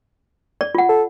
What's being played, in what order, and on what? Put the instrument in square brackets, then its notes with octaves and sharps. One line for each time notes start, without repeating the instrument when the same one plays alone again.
[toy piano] D5
F4 F#5
[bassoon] A4